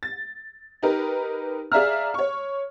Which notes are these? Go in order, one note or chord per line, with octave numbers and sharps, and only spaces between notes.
A6
D#4 G4 A#4 B4
G#4 D5 E5 F5 A#5 F6
C#5 C#6